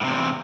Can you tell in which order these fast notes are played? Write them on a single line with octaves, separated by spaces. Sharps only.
A2 C3 E2